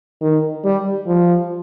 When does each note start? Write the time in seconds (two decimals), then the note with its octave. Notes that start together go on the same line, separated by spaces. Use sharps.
0.22 D#3
0.64 G3
1.07 F3